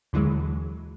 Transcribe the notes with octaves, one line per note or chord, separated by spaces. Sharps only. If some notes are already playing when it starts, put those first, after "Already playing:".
D#2 D3 E3 F#3 G#3